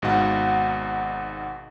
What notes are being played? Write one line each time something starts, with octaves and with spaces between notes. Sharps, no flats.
G#1 G#2 B2 D#4 F5 F#5